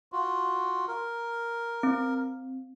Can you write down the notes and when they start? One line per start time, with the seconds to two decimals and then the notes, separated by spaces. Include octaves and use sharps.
0.12 F4 F#4
0.88 A#4
1.83 C4